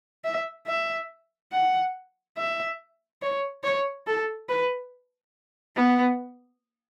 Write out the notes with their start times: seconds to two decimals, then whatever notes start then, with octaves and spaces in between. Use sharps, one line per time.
0.25 E5
0.67 E5
1.52 F#5
2.37 E5
3.22 C#5
3.64 C#5
4.07 A4
4.49 B4
5.76 B3